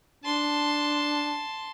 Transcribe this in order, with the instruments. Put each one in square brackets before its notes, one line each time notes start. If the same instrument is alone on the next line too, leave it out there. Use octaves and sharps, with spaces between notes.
[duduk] D4 [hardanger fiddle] A5 C6